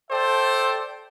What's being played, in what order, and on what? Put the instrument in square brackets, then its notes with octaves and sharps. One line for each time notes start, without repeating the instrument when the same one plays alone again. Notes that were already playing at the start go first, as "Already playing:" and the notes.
[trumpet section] A4 C5 D5 E5 G5 A5